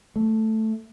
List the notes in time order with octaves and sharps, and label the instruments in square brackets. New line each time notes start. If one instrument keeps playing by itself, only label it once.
[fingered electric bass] A3